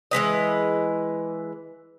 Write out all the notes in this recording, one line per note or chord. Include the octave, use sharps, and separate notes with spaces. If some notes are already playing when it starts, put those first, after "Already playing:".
E3 G#3 B4 D#5